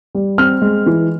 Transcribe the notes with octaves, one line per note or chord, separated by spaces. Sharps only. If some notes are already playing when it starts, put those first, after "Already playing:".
G3
C4 F6
G#3
E3